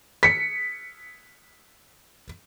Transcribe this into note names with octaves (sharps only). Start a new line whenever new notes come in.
B6 C#7